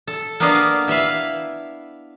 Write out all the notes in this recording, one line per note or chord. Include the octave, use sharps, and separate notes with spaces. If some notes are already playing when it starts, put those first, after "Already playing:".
A4
A#3 B3 D4 B4 D#5 F5
E4 B4 E5 F5